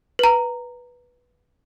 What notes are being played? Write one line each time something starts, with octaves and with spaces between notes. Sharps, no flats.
B4 A#5